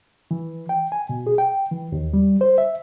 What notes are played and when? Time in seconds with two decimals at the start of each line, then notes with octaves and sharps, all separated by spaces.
0.31 E3
0.69 G5
0.92 G#5
1.09 B2
1.27 G#4
1.38 G5
1.71 E3
1.92 D#2
2.13 G3
2.41 C5
2.58 E5